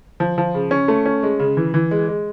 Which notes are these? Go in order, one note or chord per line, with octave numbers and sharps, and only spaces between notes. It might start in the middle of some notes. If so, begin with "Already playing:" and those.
F3
F3
C#3
C#4
A3
C#4
G#3
C#3
E3
E3
G#3
G#3